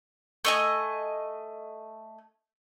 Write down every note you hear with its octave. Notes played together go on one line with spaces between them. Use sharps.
A3 D#5 G#5